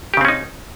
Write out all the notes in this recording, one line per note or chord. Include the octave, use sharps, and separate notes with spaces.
C#3 C4 C#4 D#4 G4